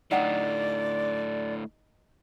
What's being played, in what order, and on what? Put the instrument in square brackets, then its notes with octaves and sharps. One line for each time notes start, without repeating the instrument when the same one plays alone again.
[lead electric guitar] A2 D3 [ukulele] D#4 F#5 G5 [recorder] D5